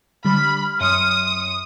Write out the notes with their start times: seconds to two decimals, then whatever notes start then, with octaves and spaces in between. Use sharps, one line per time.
0.25 D3 G3 B5 F6
0.81 F#2 C6 D#6 C#7